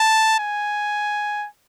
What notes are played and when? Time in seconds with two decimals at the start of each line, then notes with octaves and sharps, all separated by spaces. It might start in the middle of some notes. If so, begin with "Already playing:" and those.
Already playing: A5
0.39 G#5